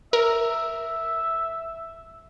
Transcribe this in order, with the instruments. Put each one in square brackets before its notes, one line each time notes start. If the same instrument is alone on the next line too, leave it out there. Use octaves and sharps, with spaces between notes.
[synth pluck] A#4 [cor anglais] E5